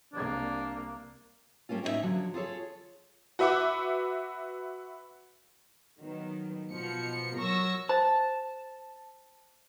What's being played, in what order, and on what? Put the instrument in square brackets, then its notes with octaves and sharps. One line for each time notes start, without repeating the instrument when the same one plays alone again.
[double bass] C2 A#3 [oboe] D4
[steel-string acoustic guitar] G3 A3 A#3 C#4 F4
A2 C#4 D#4 E4 C#5 E5
D3 F3 F#3 D4
F4 G#4 A4 C#5
[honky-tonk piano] F#4 B4 E5 F#5 D6
[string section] D#3 F#3 B3
B2 F3 C#7
F#3 A#4 C#6 E6 A#6
[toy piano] C5 [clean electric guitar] A5